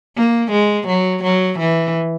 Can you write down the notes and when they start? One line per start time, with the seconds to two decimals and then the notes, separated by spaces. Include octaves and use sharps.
0.16 A#3
0.51 G#3
0.87 F#3
1.23 F#3
1.59 E3